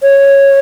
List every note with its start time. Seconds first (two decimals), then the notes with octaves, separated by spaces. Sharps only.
0.02 C#5